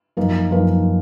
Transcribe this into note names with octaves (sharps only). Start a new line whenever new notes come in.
F#2 F3 A#3 D#4 A#4
F#2 F3 A#3 D#4 A#4